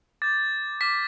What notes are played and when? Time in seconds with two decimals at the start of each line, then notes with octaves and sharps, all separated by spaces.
0.22 D6 G6 A6
0.81 D6 F6 B6